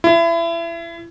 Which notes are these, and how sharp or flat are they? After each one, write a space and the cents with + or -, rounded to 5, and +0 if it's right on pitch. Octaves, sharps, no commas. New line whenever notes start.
E4 +30